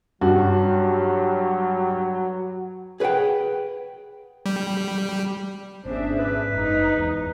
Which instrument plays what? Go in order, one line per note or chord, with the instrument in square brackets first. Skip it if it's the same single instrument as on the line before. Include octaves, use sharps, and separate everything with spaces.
[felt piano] G2 [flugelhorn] F#3 [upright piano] F#4
[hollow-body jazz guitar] G#4 B4 C5 F#5 G5
[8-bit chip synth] G3
[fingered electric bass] G#1 B3 C#4 [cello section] D4 G#4 E5 [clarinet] C5
[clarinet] B4
[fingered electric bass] F#1 [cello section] G#2 D#4
[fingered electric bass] E2